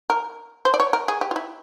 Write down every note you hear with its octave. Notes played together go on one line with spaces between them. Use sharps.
A#4
C5
D5
C#5
A#4
G#4
G4
F4
E4